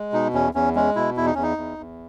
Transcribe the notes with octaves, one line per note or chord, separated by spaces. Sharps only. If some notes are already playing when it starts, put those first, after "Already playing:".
Already playing: G#3
B2 D#4
E2 C#4
E2 C#4
G#3 C#4
B2 E4
E2 E4
D#4
E2 C#4
D#4
E2
E2